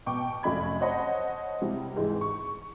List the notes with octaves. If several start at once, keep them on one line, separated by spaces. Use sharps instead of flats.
B2 G5 C#6 D6
F1 F#2 A3 D#5 B5 G#6
C5 C#5 D#5 F#5 A5
C3 G3 E4
G#2 E3 G#3
C#6